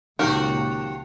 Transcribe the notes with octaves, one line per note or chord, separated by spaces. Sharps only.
C#2 A#2 D#3 F3 F#4 G4 A#4 F#5